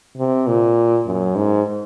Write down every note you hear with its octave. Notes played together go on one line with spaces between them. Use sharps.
C3
A#2
F#2
G#2